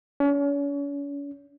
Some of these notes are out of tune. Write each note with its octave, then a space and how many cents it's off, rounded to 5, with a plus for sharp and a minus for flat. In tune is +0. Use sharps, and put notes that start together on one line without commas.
C#4 +40